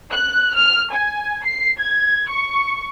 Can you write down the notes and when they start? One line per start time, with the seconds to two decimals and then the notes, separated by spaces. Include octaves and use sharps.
0.12 F#6
0.54 F6
0.92 G#5
1.44 C7
1.79 G#6
2.28 C#6